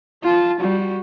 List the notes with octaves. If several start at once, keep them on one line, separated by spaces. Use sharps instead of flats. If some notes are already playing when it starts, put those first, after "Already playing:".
F4 A5
G3 F#4